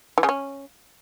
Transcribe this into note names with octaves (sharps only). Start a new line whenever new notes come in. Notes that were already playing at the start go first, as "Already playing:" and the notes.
E3
C#3
C#4